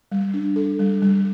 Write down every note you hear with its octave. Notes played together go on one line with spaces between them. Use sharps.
G3
D4
A4
G3
G3